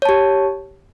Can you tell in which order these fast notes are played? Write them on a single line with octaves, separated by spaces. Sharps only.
C#5 A5 G4